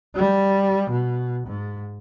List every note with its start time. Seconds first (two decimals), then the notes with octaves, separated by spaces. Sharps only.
0.15 G3
0.90 B2
1.47 G#2